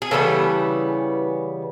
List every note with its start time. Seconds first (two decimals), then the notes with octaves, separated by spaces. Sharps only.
0.02 G#4
0.11 C#3 E3 G3 B3 A4